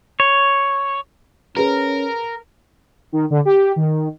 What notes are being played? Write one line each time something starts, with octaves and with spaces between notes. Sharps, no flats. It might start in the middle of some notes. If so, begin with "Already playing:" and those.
C#5
C#4 G#4 A#4 B4
D#3
D3
G4
D#3